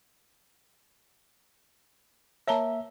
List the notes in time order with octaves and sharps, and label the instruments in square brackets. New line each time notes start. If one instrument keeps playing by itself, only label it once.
[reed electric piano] A#3 E5 [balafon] C#5 A5 A#5